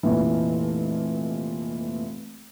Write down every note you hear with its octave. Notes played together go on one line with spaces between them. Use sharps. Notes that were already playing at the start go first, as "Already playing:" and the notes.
F1 A#2 E3